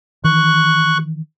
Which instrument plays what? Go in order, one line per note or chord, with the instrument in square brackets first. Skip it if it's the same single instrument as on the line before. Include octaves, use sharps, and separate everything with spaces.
[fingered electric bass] D#3 E3 [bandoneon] C#6 F#6